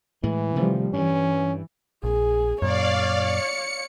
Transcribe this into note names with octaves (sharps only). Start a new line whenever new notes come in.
A2 E3 G#3
C3 D#3 F3 G3 A3
G2 E3 C#4
A#1 G#4
F#2 A#2 C#5 D5 F5
C#7